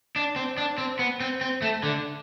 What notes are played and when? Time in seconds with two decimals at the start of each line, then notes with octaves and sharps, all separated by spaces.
0.16 D4
0.36 C4
0.58 D4
0.78 C4
0.99 B3
1.20 C4
1.41 C4
1.62 A3
1.83 D3